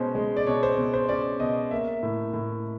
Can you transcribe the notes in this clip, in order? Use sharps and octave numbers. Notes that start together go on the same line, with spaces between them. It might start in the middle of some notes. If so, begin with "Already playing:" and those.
Already playing: B2 G#3 C#4 C5
G#3
D5
B2 C#5
C5
B2
C5
C#4 D5
B2 D#5
A#3 E5
A2
A2